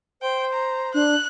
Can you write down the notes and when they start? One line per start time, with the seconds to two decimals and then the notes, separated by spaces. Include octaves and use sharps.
0.22 C5 G5
0.52 A#5
0.94 D4 F#6